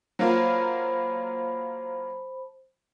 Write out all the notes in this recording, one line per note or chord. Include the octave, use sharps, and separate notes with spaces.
F#3 A#3 F4 C5 A5 B5